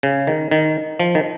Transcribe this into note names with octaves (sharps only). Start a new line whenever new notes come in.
C#3
D#3
D#3
F3
D#3